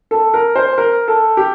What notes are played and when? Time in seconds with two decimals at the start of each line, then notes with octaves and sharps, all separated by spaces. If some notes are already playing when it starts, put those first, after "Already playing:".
0.11 A4
0.34 A#4
0.56 C5
0.78 A#4
1.08 A4
1.37 G4